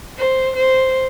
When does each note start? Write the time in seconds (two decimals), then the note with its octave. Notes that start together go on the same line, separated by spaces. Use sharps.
0.18 C5
0.56 C5